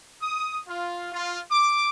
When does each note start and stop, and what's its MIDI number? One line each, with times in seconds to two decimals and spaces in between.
0.21 0.57 87
0.66 1.08 65
1.11 1.39 65
1.49 1.89 86